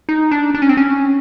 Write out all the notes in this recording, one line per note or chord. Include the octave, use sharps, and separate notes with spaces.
D#4
D4
D4
C#4
C4
C#4